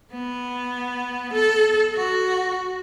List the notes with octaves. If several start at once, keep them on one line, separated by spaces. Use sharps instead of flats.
B3
A4
F#4